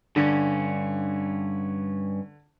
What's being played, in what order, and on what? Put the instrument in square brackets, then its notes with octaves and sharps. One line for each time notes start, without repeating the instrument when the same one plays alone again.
[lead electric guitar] G2 C#4 [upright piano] D3